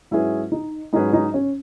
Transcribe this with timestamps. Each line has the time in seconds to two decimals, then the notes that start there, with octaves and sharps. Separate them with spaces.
0.11 G#2 F#3 C#4 E4 G#4 B4
0.52 D#4
0.93 G#2 F#3 C#4 D#4 G#4 B4
1.13 D#4
1.34 C#4